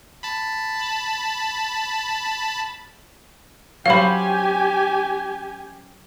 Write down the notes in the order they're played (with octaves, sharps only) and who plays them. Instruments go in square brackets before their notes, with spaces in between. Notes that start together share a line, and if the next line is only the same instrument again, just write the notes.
[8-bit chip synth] A5 B5
[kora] F#3 C#4 C5 [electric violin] G4 G#5 [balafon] F5 B5